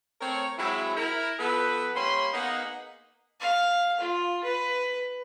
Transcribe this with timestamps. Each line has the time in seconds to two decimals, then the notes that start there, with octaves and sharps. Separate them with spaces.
0.21 A3 C4 A#4 C#5
0.58 F#3 G#3 C4 E4
0.96 E4 A#4
1.40 F3 B3 A4 B4
1.95 G3 A#3 C#4 B5 C6
2.33 A#3 B3 D#4 G#4 D#5 F#5
3.40 F5
4.00 F4
4.44 B4